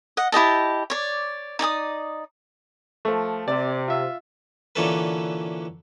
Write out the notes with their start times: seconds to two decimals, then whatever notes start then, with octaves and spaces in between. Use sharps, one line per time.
0.17 D#5 F#5
0.32 E4 G4 D#5 A5
0.90 C#5 D5
1.59 D#4 D5 G#5 D#6
3.05 F3 A3
3.48 C3 D5
3.88 F4 E5
4.76 A#2 D3 E3 C#4 A4 B4